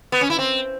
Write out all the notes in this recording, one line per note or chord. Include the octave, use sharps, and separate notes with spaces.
B3
C#4
E4
C4